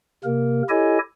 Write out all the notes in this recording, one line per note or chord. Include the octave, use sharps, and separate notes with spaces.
C3 A#3 A#4
E4 G4 A4 C#5 D#5 G#5